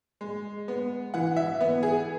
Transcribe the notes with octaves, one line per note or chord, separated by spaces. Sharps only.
G#3
B3
E3 F#5
E5
B3
G#4